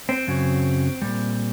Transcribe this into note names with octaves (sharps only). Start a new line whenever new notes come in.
C4
F#2 C#3 F#3
A#2 G3